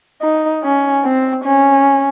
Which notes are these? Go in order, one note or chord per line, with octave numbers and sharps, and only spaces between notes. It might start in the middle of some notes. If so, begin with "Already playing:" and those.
D#4
C#4
C4
C#4